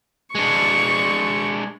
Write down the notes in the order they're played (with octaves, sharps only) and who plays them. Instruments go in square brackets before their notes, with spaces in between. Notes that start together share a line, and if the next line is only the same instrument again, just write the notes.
[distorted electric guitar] G#3 D4 [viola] C#6